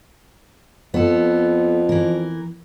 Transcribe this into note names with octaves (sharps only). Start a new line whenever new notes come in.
F2 B3 A4
E3 A#4